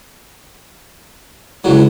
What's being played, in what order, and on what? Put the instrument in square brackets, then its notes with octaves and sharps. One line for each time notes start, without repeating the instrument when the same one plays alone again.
[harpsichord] C#2 F#3 [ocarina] E4